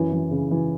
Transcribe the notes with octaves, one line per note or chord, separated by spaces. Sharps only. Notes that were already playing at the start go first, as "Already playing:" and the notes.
Already playing: F#2 E3
E3
C#3
E3